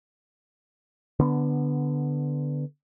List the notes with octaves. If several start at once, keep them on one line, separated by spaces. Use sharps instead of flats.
D3 B3